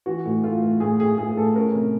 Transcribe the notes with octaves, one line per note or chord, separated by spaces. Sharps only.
E3 F#4
A2
A3 F4
A3
A2 G#4
A2 G#4
A2 G#4
A2 A4
C#4 A#4
C3